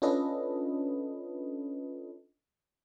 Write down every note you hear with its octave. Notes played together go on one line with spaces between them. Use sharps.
C#4 D4 F4 A4 B4 D#5